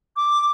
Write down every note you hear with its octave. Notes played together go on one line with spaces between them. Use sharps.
D6